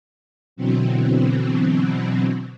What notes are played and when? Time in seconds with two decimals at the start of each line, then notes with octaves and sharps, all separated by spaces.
0.56 B2 D3 E3 F#3 C4